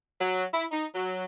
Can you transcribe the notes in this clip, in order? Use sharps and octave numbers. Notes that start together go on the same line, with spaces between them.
F#3
E4
D#4
F#3